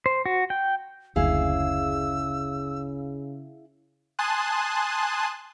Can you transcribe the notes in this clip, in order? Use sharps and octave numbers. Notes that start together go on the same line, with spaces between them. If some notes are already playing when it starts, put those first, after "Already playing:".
C5
F#4
G5
F#1 D2 C#3 E4 G#4 F5 E6
G#5 A5 C6 D#6 F#6